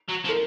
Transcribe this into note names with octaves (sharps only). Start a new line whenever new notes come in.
F#3
F3
A#4